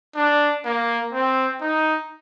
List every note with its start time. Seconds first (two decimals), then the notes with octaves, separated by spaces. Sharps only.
0.16 D4
0.65 A#3
1.13 C4
1.61 D#4